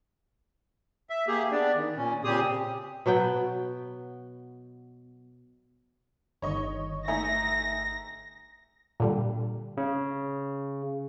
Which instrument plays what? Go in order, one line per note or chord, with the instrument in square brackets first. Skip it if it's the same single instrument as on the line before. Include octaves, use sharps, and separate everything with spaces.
[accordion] E5
A#3 G4 G#4
B3 D4 D5
D#3
A#2 C#4
A#2 C#3 C4 G4 G#4 D#6
[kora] B2 F#3 B3 G5
[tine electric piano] G1 [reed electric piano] D3 D#3 [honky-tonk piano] C#5 D#5 C#6
[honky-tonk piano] A3 D#4 E5 [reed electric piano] G#5 A#5 [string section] A#6
[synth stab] A#2 D3 G3
[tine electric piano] C#3